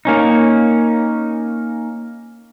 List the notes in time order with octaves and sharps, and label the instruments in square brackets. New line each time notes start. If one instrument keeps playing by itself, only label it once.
[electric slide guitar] A#3 C#4 D#4